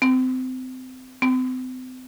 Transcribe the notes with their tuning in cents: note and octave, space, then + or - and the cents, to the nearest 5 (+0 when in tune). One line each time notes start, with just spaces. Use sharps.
C4 -30
C4 -40